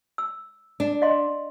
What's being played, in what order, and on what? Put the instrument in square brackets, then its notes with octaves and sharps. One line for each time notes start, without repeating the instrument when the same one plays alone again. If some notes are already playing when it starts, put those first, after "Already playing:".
[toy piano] E6
[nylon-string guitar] D4
[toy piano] D#5 F5 C6